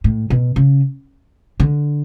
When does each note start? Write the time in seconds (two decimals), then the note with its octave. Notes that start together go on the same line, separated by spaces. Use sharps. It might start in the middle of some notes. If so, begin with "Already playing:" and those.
0.04 A2
0.30 B2
0.56 C#3
1.60 D3